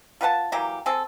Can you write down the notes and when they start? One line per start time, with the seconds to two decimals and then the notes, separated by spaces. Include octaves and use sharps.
0.21 F4 B4 F#5 A5
0.52 E3 F#3 A#3 G4
0.86 C4 G#4 A4